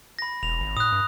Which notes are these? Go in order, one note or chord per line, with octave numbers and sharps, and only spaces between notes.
B5 A#6
E1 F7
G#1
A2 D#6 F#6
G2